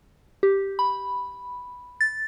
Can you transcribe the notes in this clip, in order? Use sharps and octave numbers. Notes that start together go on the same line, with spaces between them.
G4
B5
A6